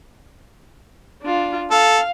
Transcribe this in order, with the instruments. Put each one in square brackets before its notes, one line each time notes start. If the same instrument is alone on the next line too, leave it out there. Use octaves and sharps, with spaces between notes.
[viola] D4 F4
[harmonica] A4 [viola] F5